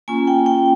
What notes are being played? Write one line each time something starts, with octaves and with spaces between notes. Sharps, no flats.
A#3 C#4 F4 G#5
G5
G5